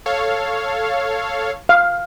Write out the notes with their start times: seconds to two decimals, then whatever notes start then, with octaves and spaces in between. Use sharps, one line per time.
0.06 A4 C#5 F5
1.69 F5